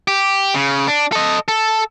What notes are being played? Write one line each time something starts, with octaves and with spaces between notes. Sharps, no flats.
G4
C#3
D4
A4 D#5
A4